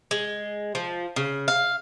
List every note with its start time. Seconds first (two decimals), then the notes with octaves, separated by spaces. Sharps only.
0.11 G#3
0.75 F3
1.16 C#3
1.48 F5